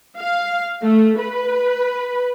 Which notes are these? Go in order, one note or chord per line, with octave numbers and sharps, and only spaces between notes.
F5
A3
B4